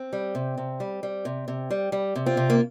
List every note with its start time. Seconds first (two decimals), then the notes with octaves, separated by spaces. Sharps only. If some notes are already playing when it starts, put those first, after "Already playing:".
Already playing: C4
0.13 G3
0.35 C3
0.57 C3
0.80 G3
1.03 G3
1.25 C3
1.48 C3
1.71 G3
1.92 G3
2.15 C3
2.26 C4 F4
2.37 C3
2.50 A#3